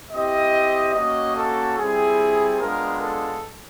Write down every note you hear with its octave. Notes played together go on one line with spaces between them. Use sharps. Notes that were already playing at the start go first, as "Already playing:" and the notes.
C4 E4 G4 D#5
A#3 C#4 F#4 D#5
A4
G3 C4 E4 G#4
G#3 B3 D4 F4 A#4
A4